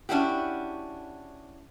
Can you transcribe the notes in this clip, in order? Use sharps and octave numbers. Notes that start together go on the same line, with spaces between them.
C#4 D4 E4 F#4 G4